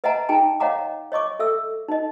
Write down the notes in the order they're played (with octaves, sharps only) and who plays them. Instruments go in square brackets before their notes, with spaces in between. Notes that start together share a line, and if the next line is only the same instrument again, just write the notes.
[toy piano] B4 D#5 E5 F#5 G#5 A#5
D#4 G#4 G5 G#5 A#5
C#5 D#5 F5 F#5 A#5 D6
C#5 D#5 C#6 D6
A4 E5 E6
D#4 D#5